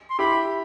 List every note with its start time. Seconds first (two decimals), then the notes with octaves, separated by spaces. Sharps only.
0.10 C6
0.19 E4 G4 B5